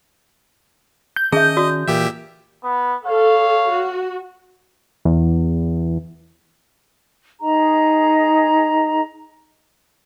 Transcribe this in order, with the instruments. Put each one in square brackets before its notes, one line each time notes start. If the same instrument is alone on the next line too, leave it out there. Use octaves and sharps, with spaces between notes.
[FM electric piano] G6
[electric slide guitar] D#3 C#4 A5 [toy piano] G#4 E5 [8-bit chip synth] D#5
[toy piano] F#4 D5 D#6
[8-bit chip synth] A#2 G4 E5 [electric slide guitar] E3
[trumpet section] B3
[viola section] A4 [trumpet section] C#5 F5
[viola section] F#4
[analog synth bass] E2
[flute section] D#4 G#4 D#5 A#5